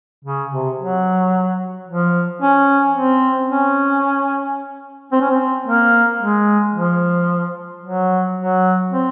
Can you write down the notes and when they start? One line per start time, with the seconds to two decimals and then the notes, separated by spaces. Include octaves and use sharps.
0.25 C#3
0.52 C3
0.79 F#3
1.88 F3
2.42 C#4
2.95 C4
3.49 C#4
5.12 C4
5.21 C#4
5.30 C4
5.67 A#3
6.20 G#3
6.74 F3
7.83 F#3
8.37 F#3
8.91 C4